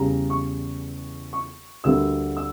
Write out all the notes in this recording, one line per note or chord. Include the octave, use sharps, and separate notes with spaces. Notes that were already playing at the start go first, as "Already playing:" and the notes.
Already playing: E2 C#3 G3 A#5
C#6
C#6
D2 D3 G3 A#3 E6
E6